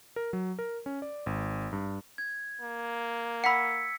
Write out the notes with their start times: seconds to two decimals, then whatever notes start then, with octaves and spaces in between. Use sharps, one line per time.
0.16 A#4
0.33 F#3
0.59 A#4
0.86 C#4
1.02 D5
1.26 G#1
1.73 G2
2.18 G#6
2.61 A#3
3.44 F#5 B5 E6 B6 C#7